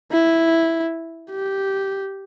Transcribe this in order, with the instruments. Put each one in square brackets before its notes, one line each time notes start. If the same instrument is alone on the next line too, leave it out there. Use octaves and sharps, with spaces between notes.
[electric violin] E4
G4